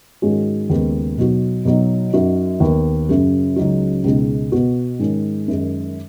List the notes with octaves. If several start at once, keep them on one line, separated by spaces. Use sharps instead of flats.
G#2 D#3 G#3 C#4 F#4
D#2 C#3 G#3 B3
B2 F#3 D#4 F#4
B2 F#3 D#4
F#2 F#3 D#4 F#4
D#2 D#3 B3
F#2 C#3 F#3
C#2 C#3 F#3 D#4 F#4
C#2 B2 G#3 D#4
B2 B3 F#4
G#2 D#3 G#3 C#4
F#2 D#3 G#3